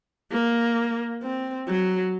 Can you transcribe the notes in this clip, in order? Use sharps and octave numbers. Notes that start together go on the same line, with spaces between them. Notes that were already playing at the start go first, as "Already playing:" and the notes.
A#3
C4
F#3